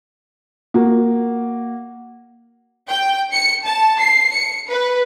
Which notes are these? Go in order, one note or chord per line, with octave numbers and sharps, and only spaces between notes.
A#3 F#4
G5
C#7
A5
C7
C#7
B4